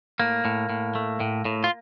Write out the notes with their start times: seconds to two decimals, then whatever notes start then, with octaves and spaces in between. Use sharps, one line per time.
0.20 A2 A#3
0.45 A2
0.69 A2
0.95 A3
1.20 A2
1.45 A2
1.64 F4